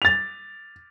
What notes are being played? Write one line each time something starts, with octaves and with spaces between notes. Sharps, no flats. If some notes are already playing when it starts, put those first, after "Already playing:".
A6 F7